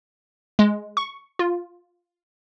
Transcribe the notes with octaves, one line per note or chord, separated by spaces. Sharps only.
G#3
C#6
F4